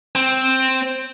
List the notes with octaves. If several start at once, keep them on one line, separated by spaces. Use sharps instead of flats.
C4